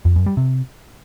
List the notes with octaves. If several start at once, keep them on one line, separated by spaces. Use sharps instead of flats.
F2
F#2
G3
C3